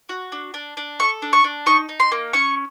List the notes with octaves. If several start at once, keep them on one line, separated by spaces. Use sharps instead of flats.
F#4
D4
D4
D4
A4 C#6
D4
C#6
D4
D#4 C#6
D#4
C6
A#3
C#4 C#6